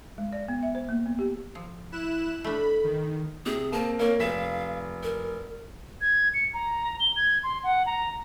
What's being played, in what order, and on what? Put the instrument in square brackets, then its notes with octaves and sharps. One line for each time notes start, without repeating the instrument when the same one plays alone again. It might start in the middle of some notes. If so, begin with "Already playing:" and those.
[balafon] G#3
D5
B3
E5
C5
A#3
B3
G4
[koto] F3
[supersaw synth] E4 F#6 E7
[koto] A3 D4 [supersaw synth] B5
[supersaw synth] D#3
[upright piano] C3 [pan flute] G#4
[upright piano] A#3 C4 [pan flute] A5
[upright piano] A#3 C#5 [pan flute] A#4
[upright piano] F1 B6 E7 [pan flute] F5
[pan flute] A#4
[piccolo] G#6
C#7
A#5
G7
G#6
C6
F#5
A#5